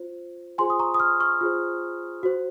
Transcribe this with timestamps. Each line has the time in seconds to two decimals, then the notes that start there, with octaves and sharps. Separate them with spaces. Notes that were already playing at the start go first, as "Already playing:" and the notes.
Already playing: F4 C5
0.58 F4 G#4 C5 G#5 C6
0.70 D#6
0.79 A#5 C#6
0.94 D#6
1.00 C#6 F6
1.20 C#6 F6
1.41 F4 G#4 C5
2.23 F#4 C5